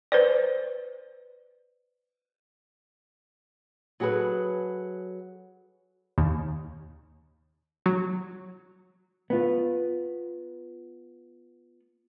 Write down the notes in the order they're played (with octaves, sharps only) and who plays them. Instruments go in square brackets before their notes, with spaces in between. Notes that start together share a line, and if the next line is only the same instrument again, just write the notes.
[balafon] B4 C5 D5
[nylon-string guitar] F#3 F#4 G#4 A4 B4
[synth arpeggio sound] D#2
F#3
[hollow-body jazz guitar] B3 F4